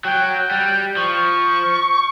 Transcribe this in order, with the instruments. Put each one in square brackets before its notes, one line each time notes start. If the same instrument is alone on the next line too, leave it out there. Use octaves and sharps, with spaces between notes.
[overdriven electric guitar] F#3 [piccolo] G5
[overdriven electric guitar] G3 [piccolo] G5
[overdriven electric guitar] F3 [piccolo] C#6